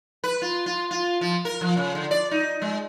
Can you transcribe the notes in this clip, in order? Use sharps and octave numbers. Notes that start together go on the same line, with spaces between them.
B4
F4
F4
F4
F3
A#4
F3
C#3
D3
D5
D#4
G#3